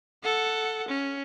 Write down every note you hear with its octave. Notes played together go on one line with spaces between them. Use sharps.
A4 F#5
C#4